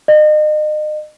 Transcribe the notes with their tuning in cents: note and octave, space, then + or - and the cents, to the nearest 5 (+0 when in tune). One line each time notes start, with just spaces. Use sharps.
D#5 -35